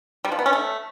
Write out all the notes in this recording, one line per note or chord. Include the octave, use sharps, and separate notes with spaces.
G3
F3
B3
C#4
A3